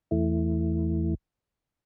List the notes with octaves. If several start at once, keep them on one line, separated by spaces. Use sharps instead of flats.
E2 E3 A3 E4